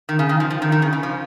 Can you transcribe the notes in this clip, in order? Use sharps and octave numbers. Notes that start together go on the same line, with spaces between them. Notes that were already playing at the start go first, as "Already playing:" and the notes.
D#3
C#3
D#3
F3
F3
D#3
D#3
C#3
C#3
F3